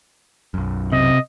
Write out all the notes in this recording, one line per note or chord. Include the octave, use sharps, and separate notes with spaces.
B1 F#2
C3 D#5